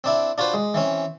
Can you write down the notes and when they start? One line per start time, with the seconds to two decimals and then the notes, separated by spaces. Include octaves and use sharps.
0.04 C4 D4 E4
0.38 D4 F4 F#4 B4 C5
0.54 G#3
0.74 E3 C4 C#4